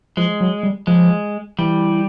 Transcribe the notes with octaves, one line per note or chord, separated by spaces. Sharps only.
F3 G#3
F#3
G3
F3 G#3
E3 G3